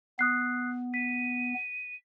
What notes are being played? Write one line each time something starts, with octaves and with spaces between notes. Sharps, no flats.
B3 D#6 F#6 C7
B6 D#7